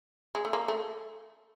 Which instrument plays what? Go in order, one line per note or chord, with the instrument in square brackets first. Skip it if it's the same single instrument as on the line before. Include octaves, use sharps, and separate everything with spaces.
[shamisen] G#3
A3
A#3
A3